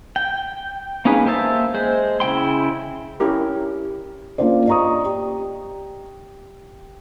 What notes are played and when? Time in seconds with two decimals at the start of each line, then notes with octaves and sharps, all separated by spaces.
0.16 G5
1.05 A#3 C#4 D#4 G#4 B4
1.26 A#3 G4 C5 E5 A5
1.74 G#3 C5
2.20 C#3 E4 G5 C6
3.20 C#4 E4 G4 A#4
4.38 A#3 C#4 D4 F4 C5 D5
4.67 D5 D#5 A#5 C#6 D#6
5.04 G4